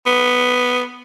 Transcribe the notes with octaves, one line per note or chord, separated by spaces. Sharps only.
B3